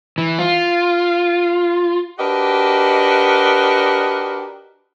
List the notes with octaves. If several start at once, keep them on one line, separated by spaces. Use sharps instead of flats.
E3
F4
D4 F#4 G4 A#4 B4 D#5